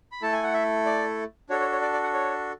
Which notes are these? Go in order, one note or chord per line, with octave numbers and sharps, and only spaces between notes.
B5
A3 E4 A4 A5
G#5
F#5
E5
D5
D4 F#4 A4 C#5
C#5
C#5
D5
D5
F#5
C#5